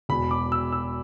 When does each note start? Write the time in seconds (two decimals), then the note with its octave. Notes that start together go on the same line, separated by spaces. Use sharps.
0.09 E1 E2 B2 B5
0.31 D6
0.52 E6
0.72 E6